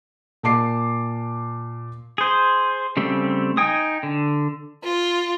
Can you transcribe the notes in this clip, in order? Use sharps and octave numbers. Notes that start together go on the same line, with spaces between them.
A#2 A5 D6 C7
G#4 C5
C#3 G3 A3 C4
D#4 G5 G#5 D#6
D3
F4